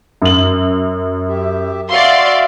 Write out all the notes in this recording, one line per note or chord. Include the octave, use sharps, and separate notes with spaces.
F#2 F#7
G4 E5
F#4 D5 E5 F5 C6